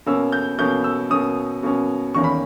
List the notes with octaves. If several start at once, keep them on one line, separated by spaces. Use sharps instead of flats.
B2 A#3 C#4 E6
G6
B2 A#3 C#4 G6
E6
B2 A#3 C#4 D#6
B2 A#3 C#4
E2 D#3 A#3 C#4 C#6
B5